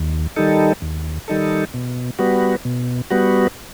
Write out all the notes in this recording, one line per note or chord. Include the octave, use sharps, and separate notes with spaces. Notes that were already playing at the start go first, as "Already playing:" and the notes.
Already playing: D#2
D#3 G3 D#4 A4
D#2
D#3 G3 D#4 A4
B2
G3 B3 F#4
B2
G3 B3 F#4